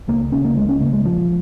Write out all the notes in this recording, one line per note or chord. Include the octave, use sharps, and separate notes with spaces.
C#2 A#3
C#3 C#4
A#3
C#2 G#3
C#4
C#3 A#3
G#3
A#1 F3